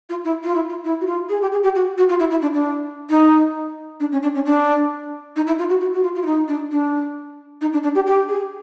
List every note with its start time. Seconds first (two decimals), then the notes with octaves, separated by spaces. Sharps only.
0.09 F4
0.24 E4
0.43 F4
0.55 E4
0.69 F4
0.84 E4
1.01 F#4
1.06 F4
1.29 G#4
1.41 G4
1.52 G#4
1.63 G4
1.75 F#4
1.98 F#4
2.09 F4
2.19 E4
2.30 E4
2.42 D4
2.54 D4
3.09 D#4
4.00 D4
4.12 C#4
4.23 D4
4.35 C#4
4.45 D4
5.36 D#4
5.47 E4
5.58 F4
5.69 F#4
5.80 F#4
5.93 F#4
6.03 F4
6.15 F4
6.22 E4
6.26 D#4
6.48 D4
6.71 D4
7.61 D#4
7.73 D4
7.83 D4
7.95 G4
8.06 G4
8.28 G#4